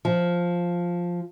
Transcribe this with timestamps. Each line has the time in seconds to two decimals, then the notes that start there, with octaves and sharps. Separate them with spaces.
0.05 F3